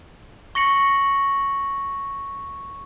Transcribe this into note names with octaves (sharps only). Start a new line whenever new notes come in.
C#6 A#6 C#7 F#7